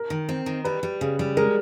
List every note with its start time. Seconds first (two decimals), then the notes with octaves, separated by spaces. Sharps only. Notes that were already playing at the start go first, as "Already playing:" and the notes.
Already playing: A#4
0.10 D#3
0.29 C4
0.46 D#3
0.65 G3 B4
0.83 G3
1.01 C#3
1.19 G3
1.37 G#3 A#4